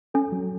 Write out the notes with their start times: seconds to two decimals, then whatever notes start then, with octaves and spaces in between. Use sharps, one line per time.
0.14 C#4 A4
0.32 F#3